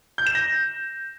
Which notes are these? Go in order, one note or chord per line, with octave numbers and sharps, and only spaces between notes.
G6
E7
A#6